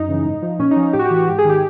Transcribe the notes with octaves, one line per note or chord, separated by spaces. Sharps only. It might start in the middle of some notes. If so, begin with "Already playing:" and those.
Already playing: F#2 D#4
C#3 E3
G#2
F3
A#2 C#4
D#4
F3
A2 G4
F#4
G4
E3
F#4
G#2 G4
G#4
D#3 G4